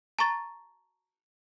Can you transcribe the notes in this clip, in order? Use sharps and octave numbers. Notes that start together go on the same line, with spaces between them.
A5 A#5 C#6 A6